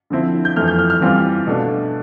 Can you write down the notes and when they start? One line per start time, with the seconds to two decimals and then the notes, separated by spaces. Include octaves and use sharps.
0.10 D3 F3 C4 E4
0.45 G6
0.56 F2 E3 A3 C4 F6
0.68 G6
0.79 F6
0.90 F6
1.01 E3 G3 C4 F4
1.47 B2 A3 D4